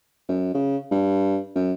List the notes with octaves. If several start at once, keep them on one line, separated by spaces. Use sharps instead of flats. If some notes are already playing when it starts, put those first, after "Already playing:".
F#2
C#3
G2
F#2